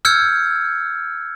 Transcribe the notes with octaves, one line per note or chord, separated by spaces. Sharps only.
E6 F6 G6 G#6 C#7